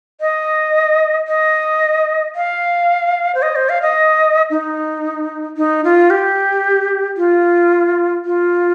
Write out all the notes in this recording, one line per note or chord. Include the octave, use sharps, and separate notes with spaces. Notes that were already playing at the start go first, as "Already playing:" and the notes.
D#5
D#5
F5
C5
D#5
C5
F5
D#5
D#4
D#4
F4
G4
F4
F4